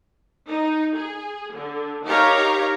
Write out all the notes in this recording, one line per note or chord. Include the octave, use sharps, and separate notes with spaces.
D#4
G#4
D3
D#4 G4 A#4 C#5 F5 A#5